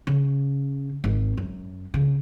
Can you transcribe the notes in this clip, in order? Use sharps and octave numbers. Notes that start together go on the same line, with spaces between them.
C#3
G#1
F#2
C#3